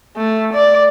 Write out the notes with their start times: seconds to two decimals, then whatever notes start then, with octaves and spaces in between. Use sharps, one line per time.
0.16 A3
0.53 D5